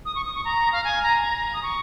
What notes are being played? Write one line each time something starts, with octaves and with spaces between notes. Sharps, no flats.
D#6
C#6
D#6
C#6
A#5
F5
G#5
A#5
A#5
D#6
C#6